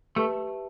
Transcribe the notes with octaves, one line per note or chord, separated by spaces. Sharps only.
A3 G4 B4 E5 A5